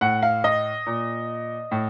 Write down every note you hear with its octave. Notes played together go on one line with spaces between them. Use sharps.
A2 F#5
F5
D#5
A#2
A2